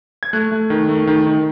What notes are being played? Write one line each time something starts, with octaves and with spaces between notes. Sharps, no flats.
G#6
A3 F#6
A3
D#3
A3
D#3
D#3